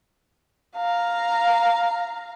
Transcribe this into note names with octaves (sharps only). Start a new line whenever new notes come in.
F5 A#5